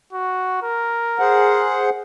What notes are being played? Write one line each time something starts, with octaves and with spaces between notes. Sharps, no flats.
F#4
A#4
G#4 C5 F#5